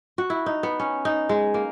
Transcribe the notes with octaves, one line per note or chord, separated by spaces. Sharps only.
F#4
E4
D#4
B3
C#4
D#4
G#3
A#3